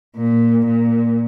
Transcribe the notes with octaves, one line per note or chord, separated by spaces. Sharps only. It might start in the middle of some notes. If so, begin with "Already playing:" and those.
A#2
A#2